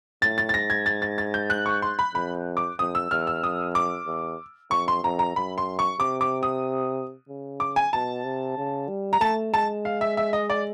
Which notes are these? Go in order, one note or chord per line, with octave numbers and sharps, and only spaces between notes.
A2 A6
A6
A6
G#2 A#6
G#6
A6
A6
A6
G6
F#6
C#6
C6
B5
F2 B5
D6
F2 D#6
E6
E2 F6
E6
F2 D#6
D6
E2
F2 C#6
C6
F2 A#5
A#5
F#2 B5
C6
C#6
C3 D6
D6
D#6
C#3
D6
G#5
B2 A5
C3
C#3
G3
A#5
A3 A5
G#3 A5
F5
E5
E5
D#5
D5